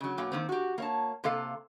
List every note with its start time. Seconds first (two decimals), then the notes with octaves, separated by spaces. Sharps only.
0.01 C#3 F#3
0.17 B2 F#3 A#3 G5
0.32 D#3 A#3 C4
0.49 F#4 G4
0.78 A#3 C#5 A5
1.24 C3 A#3 A4 F5